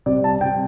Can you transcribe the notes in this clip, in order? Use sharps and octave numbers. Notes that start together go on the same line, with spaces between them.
C3 G3 C4 D5
A5
C3 G3 C4 G5